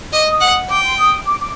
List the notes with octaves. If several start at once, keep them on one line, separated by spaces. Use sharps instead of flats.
D#5 D6
D#6
F#5
G5 D6
C6
D#6
D6
D6